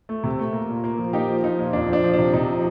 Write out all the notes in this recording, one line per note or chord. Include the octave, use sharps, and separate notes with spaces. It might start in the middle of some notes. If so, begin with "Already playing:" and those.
A3
C3
A3
A#3
A#2
A#3
F3
A#3 D#4 G4
F3
F3 D#4
A#2
F2 D4
F3 D4
F3
C3 D4
C3 D#4
F3